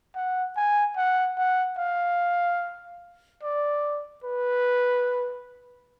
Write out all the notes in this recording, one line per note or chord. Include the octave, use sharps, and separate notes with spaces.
F#5
G#5
F#5
F#5
F5
D5
B4